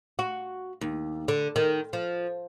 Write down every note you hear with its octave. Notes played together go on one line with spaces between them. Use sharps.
F#4
D#2
D3
D#3
F3